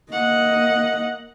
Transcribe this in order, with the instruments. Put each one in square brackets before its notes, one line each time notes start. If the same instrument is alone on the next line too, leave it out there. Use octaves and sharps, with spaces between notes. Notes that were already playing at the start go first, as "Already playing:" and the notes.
[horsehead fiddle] A#3 D#5 [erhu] F#5